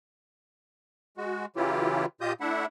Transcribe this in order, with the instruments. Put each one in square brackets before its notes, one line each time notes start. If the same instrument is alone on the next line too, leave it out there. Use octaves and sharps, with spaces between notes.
[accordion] G#3 F#4
C#3 E3 F#3 E4 F4 G4
A#2 F4 G4 D#5 D#6 G6
A3 D4 E4 E5 F#5